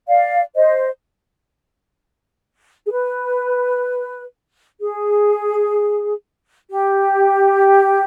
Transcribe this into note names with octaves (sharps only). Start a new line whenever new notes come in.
D5 F5
C5 D#5
G#4
B4
G#4
G4